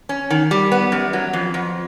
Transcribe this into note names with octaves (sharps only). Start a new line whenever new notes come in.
C#4
D#3
G3
B3
F#2
F#3
F2
F2